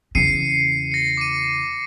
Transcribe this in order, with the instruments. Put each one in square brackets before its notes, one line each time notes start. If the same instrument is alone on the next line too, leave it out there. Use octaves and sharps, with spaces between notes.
[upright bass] E2 C#3 [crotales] C7 C#7 D#7
[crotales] A#6 C#7
D6 D#7